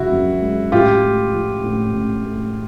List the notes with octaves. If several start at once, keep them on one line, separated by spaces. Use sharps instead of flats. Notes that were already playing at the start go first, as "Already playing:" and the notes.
Already playing: F#2 C#3 F3 G#3 E4 F#4
F#2
G#3
A1 F4 G4
A3
F3
A2
A1
A3